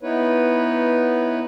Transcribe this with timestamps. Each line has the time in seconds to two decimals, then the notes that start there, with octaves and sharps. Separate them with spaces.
0.03 B3 D#4 E4 B4 C#5